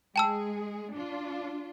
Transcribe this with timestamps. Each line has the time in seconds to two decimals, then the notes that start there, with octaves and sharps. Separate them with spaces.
0.16 G#3 G#4 G5 A5 E6
0.93 D4 F4